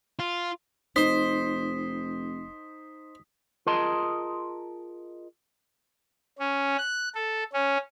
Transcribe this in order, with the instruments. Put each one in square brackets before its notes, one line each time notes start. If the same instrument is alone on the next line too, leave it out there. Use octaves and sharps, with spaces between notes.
[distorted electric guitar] F4
[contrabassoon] F1 [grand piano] D#4 [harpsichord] C5 [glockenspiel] D#6 B6
[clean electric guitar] F4 G#4 A#4 D#5 A5 C6
[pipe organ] C#4
F#6
A4
C#4